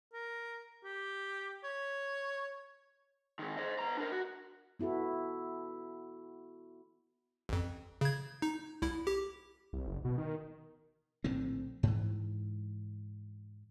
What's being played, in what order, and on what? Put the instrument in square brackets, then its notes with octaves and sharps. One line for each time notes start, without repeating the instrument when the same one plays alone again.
[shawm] A#4
G4
C#5
[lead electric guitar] G#2 D#3
C5 D#5
B3 A#5
D4 A#4
F#4
[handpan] B3 E4 F#4 A4
[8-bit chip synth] A1 F2
C#3 G#6
D#4
C2 E4
G4
[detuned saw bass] C2
F#1
B2
D#3
[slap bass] A#1 A2 D3 C4
G#2 E3